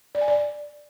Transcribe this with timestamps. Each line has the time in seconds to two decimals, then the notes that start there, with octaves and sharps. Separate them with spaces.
0.15 D5
0.21 G#5
0.28 D5